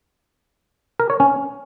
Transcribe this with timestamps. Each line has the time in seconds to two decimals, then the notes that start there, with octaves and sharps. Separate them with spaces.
1.00 A#4
1.10 C#5
1.20 C#4